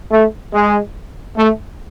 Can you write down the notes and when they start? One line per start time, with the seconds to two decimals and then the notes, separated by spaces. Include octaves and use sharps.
0.11 A3
0.52 G#3
1.36 A3